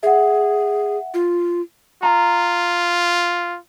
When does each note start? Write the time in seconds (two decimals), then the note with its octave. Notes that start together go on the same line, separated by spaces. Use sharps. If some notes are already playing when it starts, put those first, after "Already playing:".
0.03 G#4 E5 F#5
1.14 F4
2.03 F4 A#5